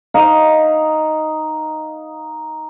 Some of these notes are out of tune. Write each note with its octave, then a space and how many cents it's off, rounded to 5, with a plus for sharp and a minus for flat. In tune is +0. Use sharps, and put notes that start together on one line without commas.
D#4 +0 F5 +10